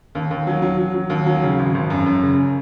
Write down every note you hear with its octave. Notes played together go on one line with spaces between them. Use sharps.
D#2
D#2
F#3
F#3
F#3
F#3
D#2
F#3
C#3
G#1
G#1
F#2
F#2
C#3